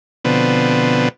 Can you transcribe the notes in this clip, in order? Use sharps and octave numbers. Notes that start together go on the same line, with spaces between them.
B2 D3 F3 B3 C4